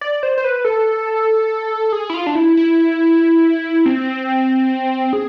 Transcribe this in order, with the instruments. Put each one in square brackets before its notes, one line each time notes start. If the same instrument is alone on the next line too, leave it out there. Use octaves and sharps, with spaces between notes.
[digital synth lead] D5
C5
C5
B4
A4
G#4
E4
F4
D4
E4
E4
C4
G#4